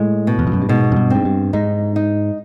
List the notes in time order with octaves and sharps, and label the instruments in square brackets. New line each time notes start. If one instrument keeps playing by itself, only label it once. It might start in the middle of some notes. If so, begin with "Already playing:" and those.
Already playing: [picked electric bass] A2 [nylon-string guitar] G#3
[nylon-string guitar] B2
[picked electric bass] E2
F2
F#2
G2
[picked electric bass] G#2 [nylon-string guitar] B2
[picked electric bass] F#2
G2
[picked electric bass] G#2 [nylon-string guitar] C4
[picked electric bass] G2
[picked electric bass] G#2 [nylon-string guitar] D#4
[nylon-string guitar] D#4